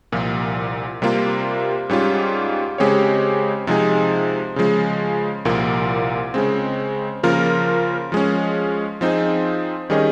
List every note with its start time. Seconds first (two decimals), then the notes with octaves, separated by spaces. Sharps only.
0.12 C2 A#2 F3
1.02 C3 G3 A#3 F4
1.89 G#2 G3 C#4 F4
2.78 C#3 G#3 C4 G4 C#5
3.67 C3 F3 G#3 D#4 G#4
4.56 C#3 F3 G#3
5.45 C2 A#2 F3 A#3 F4
6.34 C#3 G#3 C4
7.23 C#3 F3 A#3 F4 A#4
8.12 F3 G#3 C#4
9.01 F3 C4 D#4 G#4
9.90 D#3 G3 C#4 G#4 D#5